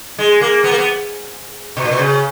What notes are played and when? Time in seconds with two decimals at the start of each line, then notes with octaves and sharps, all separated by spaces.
0.18 G#3
0.41 A#3
0.64 B3
0.71 A#3
0.78 B3
1.77 B2
1.84 A#2
1.91 B2
1.99 C#3